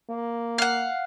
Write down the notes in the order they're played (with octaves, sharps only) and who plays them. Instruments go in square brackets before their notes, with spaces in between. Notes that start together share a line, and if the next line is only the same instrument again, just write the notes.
[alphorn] A#3
[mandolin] F5 F#5